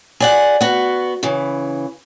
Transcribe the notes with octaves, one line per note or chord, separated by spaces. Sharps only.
G#4 D5 F#5
B3 F#4
C#3 E3